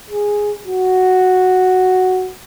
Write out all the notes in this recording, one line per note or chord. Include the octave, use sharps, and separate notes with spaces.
G#4
F#4